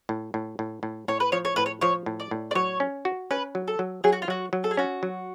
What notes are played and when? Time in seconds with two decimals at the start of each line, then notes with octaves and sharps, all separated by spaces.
0.09 A2
0.34 A2
0.59 A2
0.83 A2
1.08 A2 C#5
1.20 B4
1.32 F3 C#5
1.45 C#5
1.56 A2 B4
1.66 C#5
1.81 F3 C#5
2.06 A2
2.20 D5
2.31 A2
2.51 D5
2.55 F#3 C#5
2.80 C#4
3.05 F#4
3.31 C#4 B4
3.55 F#3
3.68 A4
3.79 F#3
4.04 F#3 G#4
4.13 F#4
4.22 F4
4.28 F#3 F#4
4.53 F#3
4.64 A4
4.71 G#4
4.77 C#4 F#4
5.03 F#3